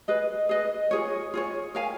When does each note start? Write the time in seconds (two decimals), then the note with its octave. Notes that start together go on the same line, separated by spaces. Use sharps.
0.08 G#4 B4 D#5
0.49 G#4 B4 D#5
0.91 F4 G#4 C#5
1.34 F4 G#4 C#5
1.75 A#4 C#5 F5 G#5